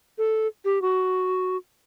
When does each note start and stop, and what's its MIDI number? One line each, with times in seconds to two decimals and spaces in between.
0.18 0.47 69
0.65 0.81 67
0.82 1.57 66